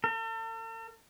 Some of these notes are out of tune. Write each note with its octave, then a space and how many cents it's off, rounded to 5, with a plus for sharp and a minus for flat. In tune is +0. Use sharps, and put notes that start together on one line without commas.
A4 +45